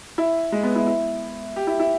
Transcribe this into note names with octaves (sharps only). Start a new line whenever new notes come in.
E4
G#3
B3
E4
E4
G4
E4
E4